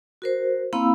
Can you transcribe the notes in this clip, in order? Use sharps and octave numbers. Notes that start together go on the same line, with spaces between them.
F#4 A#4 C5
A#3 C4 E4 F5 B5 E6